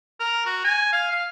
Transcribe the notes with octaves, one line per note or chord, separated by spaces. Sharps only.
A#4
F#4
G#5
F5
F5